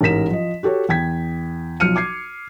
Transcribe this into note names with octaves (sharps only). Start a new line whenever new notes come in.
A1 G#2 A#4 B6 E7
F3 D#5
F#4 G4 A4 C#5
E2 G5 G#6 B6
B1 F3 F6 C#7 D#7
D6 G#6 C7